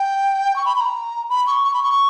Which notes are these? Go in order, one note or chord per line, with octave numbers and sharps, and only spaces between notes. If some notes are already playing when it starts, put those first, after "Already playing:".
Already playing: G5
C#6
B5
B5
A#5
B5
C#6
C#6
B5
C#6